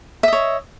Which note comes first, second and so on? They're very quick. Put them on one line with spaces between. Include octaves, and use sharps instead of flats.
E5 D#5 C#5